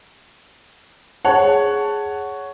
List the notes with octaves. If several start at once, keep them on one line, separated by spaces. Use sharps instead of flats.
G#4 C#5 F#5 A5